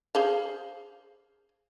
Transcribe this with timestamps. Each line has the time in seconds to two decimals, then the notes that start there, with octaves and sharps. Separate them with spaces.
0.15 G#4 C5 F5